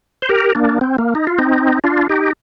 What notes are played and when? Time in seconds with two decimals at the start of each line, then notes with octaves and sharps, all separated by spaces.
0.22 C5
0.29 G4 A#4
0.55 A#3 D4
0.81 C4
0.98 A#3
1.15 D#4
1.27 F4
1.38 C4 D#4
1.84 D4 F4
2.09 D#4 G4